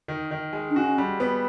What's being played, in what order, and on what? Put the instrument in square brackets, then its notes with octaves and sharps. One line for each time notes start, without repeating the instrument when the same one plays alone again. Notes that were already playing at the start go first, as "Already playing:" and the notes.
[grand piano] D#3
D#3
G#3
[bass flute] D4
[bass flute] C#4 [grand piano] F#4
[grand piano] G3
B3